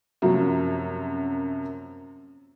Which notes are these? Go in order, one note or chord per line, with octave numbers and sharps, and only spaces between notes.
F#2 C3 F3 F#3 A#3